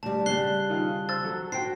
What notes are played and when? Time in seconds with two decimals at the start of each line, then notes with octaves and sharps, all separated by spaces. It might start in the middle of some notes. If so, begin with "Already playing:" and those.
0.03 D2 G3 A5
0.26 C#3 G3 F#6 C7 G7
0.69 D#3 F4
1.09 C5 E6 A6
1.24 F#3 A4
1.52 F#4 C5 G5 C7